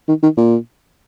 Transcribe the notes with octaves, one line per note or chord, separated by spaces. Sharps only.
D#3
D#3
A#2